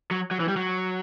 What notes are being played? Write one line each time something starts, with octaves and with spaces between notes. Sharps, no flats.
F#3
F#3
E3
G3
F#3